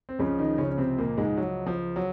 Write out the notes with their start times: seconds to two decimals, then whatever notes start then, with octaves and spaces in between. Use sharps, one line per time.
0.09 C4
0.19 C#2 C#3 F3 C#4
0.39 D#3 D#4
0.58 C#3 C#4
0.71 C#4
0.78 C3 C4
0.98 A#2 A#3
1.17 G#2 G#3
1.37 F#3
1.66 F3
1.96 F#3